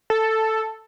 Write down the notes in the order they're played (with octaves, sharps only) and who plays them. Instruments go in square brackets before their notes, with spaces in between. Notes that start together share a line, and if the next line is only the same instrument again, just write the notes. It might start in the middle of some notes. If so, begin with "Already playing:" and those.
[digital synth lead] A4